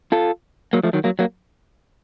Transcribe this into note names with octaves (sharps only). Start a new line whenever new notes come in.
F4 A4
F#3 A#3
F3 A3
D#3 F#3
F#3 A#3
F#3 A#3